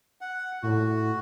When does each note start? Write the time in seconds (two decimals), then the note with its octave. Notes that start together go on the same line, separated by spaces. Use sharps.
0.21 F#5
0.63 A2 F#4